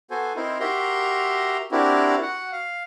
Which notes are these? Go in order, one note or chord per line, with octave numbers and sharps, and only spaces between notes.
B3 F#4 A4 C5 G#5
C4 D#4 E4 A#4 C5
F#4 G4 A#4 E5 A#5 C6
C4 D4 E4 F#4 G4 A#4
F#4 F#5
F5